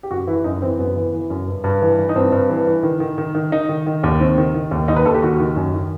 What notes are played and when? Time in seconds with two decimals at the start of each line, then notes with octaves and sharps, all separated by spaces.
0.03 G4
0.11 F#2 F#4
0.27 E3 E4
0.44 F#2 D#4
0.62 E3 C4
0.79 F#2 B3
0.96 E3
1.13 E3
1.30 F#2
1.47 G2
1.64 G2
1.82 E3
1.99 E3
2.09 D#4
2.15 G2 C4
2.32 G2
2.49 E3
2.67 E3
2.83 D#3
3.00 D#3
3.18 D#3
3.35 D#3
3.52 D#3 D#4
3.69 D#3
3.86 D#3
4.04 D#2
4.20 D#3 C4
4.38 D#3
4.54 D#3
4.71 D#2
4.88 D#2 D#4
4.96 B4
5.05 D#2 A4
5.14 G4
5.22 D#3 F#4
5.40 D#3
5.56 F#2
5.74 D#3